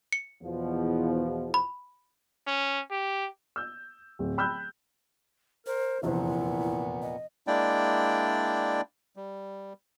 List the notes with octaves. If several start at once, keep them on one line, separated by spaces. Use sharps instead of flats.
C#7
E2 B2 F3
B5
C#4
G4
E6 G6
D1
G5 B5 E6 F#6 G6
A#4 C5
F1 E2 A#2 B3 E4 C5
D#5
G#3 A#3 D4 E4 D5 G5
G3